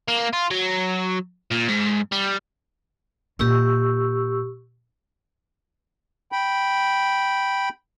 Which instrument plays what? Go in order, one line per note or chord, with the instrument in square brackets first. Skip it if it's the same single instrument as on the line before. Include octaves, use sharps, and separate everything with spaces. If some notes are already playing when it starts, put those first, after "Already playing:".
[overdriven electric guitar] A#3
F4
F#3
A#2
G#2
G3
[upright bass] A#2 A#3 [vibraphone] G4 C#6 E6
[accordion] G5 B5